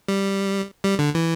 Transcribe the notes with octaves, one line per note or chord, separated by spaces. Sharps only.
G3
G3
D3
E3